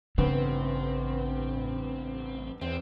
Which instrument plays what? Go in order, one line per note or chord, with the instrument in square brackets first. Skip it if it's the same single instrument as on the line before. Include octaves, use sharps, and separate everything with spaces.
[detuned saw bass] A1 [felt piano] G2 B3 [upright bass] C#3 [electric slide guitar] C4
[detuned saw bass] E2 [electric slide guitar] C4